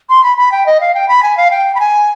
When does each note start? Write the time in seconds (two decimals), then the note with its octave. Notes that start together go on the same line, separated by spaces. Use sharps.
0.09 C6
0.23 B5
0.37 B5
0.52 G5
0.66 D#5
0.81 F5
0.94 G5
1.08 B5
1.23 G#5
1.37 F5
1.51 G5
1.75 B5
1.80 G#5